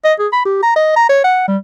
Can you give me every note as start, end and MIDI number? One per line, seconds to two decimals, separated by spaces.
0.05 0.13 75
0.19 0.28 68
0.33 0.42 83
0.46 0.60 67
0.63 0.72 82
0.76 0.92 75
0.96 1.09 82
1.09 1.20 73
1.24 1.48 78
1.48 1.57 55